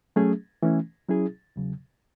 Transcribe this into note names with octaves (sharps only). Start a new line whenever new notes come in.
F#3 A3 C#4 G#4
E3 A3 C#4
F#3 C#4 E4 G#4
E2 C#3 F#3